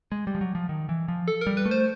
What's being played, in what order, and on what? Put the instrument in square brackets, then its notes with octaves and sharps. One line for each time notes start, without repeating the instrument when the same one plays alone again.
[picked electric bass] G#3
G3
F3
F#3
F3
D#3
E3
F3
[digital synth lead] A4
A#4
[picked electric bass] G3
[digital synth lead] B4
[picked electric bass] A3
[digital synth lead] C5